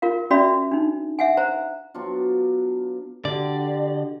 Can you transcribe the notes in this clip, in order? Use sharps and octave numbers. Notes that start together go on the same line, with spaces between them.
F4 A#4 F5
C#4 F#4 D5 E5 B5
D4 D#4
E5 F#5 G#5
C5 A#5
F#3 B3 D4 F4
D3 F#4 G4 D5